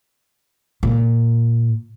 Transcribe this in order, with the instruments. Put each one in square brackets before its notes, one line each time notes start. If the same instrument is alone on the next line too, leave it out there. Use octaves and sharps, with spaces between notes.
[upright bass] A#2